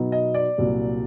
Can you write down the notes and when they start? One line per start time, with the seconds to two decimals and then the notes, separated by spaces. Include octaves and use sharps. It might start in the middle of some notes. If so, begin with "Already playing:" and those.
Already playing: B2 F#3 B3 D#4
0.12 D#5
0.34 D5
0.58 C2 A#2 F#3